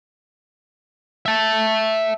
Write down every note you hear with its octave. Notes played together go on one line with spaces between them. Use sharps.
E5 A5